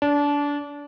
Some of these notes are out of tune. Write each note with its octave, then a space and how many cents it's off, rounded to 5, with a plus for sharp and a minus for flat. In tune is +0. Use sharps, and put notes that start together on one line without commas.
D4 -25